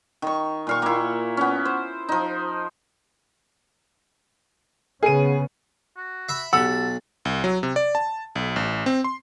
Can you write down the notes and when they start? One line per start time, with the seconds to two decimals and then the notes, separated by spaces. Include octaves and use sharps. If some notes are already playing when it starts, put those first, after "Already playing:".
0.22 D#3 C#6
0.67 A#2 F5 C#6
0.82 A#3 E4
1.37 B3 C#4
1.65 C5
2.09 F3 D#4
5.03 C#3 B3 C#4 G#4 D#7
5.97 F#4
6.29 E5 B5
6.53 B1 G4 F#5 A5 B5 E6
7.25 C2
7.44 F#3
7.63 C3
7.76 D5
7.95 A5
8.35 B1
8.56 A1
8.86 C4
9.04 C6